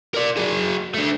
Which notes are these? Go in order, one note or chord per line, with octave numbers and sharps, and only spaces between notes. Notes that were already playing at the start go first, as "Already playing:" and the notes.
A#4 D5
F#3 G#4
A3 D4